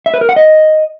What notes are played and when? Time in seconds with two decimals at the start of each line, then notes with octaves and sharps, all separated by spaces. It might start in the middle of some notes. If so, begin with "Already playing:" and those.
0.06 E5
0.14 B4
0.21 A#4
0.29 F#5
0.36 D#5